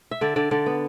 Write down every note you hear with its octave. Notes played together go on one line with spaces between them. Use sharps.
E5
D3 D5
D3 D5
D3 D5
B3